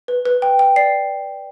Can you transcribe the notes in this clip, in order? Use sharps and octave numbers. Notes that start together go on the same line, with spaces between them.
B4
B4
G5
G5
D5 C7